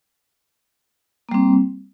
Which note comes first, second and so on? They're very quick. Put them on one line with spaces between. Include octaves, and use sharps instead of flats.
A#3 G3 C4